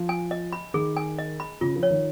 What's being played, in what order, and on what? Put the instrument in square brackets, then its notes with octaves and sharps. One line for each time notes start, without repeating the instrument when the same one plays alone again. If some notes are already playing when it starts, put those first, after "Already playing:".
Already playing: [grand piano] F3
[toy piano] G#5
D#5
B5
[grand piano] D#3 [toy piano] G#4
[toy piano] G#5
D#5
B5
[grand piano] C#3 [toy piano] F4
[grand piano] F3
[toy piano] C#5
[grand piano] D#3